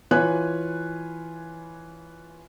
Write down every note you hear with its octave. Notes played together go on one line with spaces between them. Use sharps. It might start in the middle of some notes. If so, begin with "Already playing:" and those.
E3 F4 B4 C#5 G#5 F#6